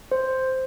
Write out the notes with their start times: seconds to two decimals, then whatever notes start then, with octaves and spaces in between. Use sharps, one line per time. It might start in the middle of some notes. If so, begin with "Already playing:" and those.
0.12 C5